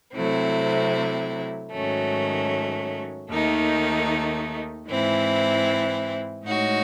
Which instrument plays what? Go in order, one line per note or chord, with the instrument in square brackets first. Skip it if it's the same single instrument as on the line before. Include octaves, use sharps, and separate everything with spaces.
[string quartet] C3 F#3 A3 C4 E4
G#2 D#3 F#3 A3 C#4
D#2 D#3 A3 D#4
G#2 E3 C4 E4
A2 G#3 D#4 F#4 C#5